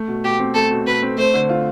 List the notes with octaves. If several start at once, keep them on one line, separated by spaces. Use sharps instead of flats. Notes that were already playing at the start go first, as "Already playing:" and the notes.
Already playing: A3
B2
B2 G4
C4
A3 A4
B2
B2 B4
C4
A3 C5
D3
F4